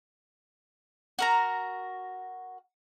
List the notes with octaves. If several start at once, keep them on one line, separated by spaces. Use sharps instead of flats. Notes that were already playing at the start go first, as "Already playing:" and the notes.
F#4 A#4 A#5